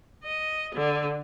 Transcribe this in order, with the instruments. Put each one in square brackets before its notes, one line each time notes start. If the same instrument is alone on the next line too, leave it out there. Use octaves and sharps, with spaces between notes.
[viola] D#5
D3